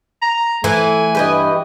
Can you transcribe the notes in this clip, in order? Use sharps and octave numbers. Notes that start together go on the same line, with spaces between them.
A#5
E3 A3 G#5
G2 G4 B4 D#5